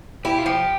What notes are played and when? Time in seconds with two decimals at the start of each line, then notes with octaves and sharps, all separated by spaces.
0.25 E4 G4
0.39 F4
0.46 F3 G4